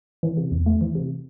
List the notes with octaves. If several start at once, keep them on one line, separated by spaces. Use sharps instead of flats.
E3
C3
E2
A3
E3
C3